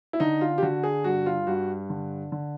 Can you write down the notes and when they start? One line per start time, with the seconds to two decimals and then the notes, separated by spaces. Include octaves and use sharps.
0.13 E4
0.20 D3 D#4
0.41 F4
0.58 G4
0.62 D3 F#4
0.84 G#4
1.04 G2 F#4
1.26 F4
1.47 G2 F#4
1.90 D3
2.32 D3